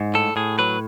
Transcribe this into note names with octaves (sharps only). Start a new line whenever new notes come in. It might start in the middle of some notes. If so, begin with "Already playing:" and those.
Already playing: G#2
A2 A4
A2 G#4
F#3 B4